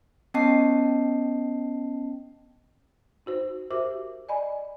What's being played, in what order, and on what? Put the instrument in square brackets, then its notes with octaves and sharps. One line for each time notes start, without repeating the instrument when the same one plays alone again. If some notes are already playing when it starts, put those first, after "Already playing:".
[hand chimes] B3 C#4 D#5 G5 A5 C7
[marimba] D#4 F#4 C5
F#4 G4 A#4 C5 E5 D6
D5 D#5 G#5 A#5 B5